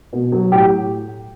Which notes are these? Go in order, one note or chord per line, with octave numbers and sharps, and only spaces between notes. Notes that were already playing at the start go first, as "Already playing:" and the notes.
B2
F#3
A2 G4